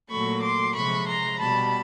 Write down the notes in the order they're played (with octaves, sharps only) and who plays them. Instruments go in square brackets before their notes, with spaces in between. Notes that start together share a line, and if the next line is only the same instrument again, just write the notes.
[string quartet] A#2 F#3 A3 B5 C#6
C6 D6
C3 F3 G#3 B5 C#6
A#5 C6
B2 G3 A5 B5